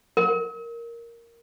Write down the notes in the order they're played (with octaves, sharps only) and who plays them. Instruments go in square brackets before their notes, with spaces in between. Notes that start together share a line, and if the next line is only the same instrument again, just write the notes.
[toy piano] A#4